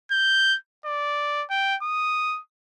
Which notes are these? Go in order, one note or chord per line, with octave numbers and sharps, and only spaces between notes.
G6
D5
G5
D#6